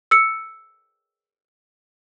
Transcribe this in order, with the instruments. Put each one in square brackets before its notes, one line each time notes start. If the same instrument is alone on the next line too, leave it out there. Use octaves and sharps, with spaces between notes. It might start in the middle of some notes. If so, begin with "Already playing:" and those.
[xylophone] E6 C#7